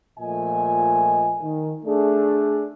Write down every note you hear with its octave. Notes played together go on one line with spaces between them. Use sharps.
A#2 F3 A3 D#5 G#5
D#3
A3 D4 G#4